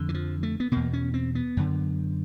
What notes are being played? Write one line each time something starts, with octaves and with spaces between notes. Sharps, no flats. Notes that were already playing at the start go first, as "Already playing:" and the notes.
Already playing: F2 D3
E3
F3
A3
B3
E2 B2 A#3
C#4
C4
B3
F#2 D3